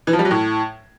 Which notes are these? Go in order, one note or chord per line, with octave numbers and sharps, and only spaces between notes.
E3
F3
G3
F#3
A2